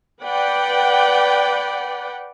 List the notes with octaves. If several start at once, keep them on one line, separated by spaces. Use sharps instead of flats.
B4 D5 F#5 G5